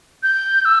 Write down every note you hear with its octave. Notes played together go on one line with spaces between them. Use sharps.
G6
E6